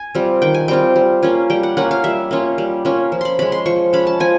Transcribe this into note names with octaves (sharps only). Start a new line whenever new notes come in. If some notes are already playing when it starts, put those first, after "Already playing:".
Already playing: G#5
G3 C4 F4
D#3 G5
G#5
G3 C4 F4 G5
G3
A#3 C#4 F4
G3 G5
F#5
A#3 C#4 F4 F#5
F5
G3 E5
A#3 C#4 F4
G3
A#3 C#4 F4
F3
B5 C6
G#3 C#4 B5
C6
F3 C#6
G#3 C#4 B5
A5
F3 G#5